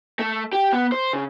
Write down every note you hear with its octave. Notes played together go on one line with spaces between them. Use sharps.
A3
G4
B3
C5
C#3